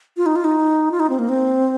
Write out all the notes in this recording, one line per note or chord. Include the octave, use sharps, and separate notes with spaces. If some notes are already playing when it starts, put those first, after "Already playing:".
F4
D#4
F4
D#4
F4
D#4
C4
A#3
C4